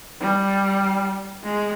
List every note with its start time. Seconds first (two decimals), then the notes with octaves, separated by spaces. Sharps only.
0.21 G3
1.44 G#3